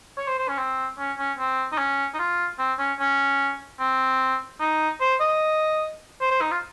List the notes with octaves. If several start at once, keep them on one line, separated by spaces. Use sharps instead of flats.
C#5
C5
C5
C#4
C4
C#4
C#4
C4
D#4
C#4
D#4
F4
C4
C#4
C#4
C4
D#4
C5
D#5
C5
C5
D#4
F4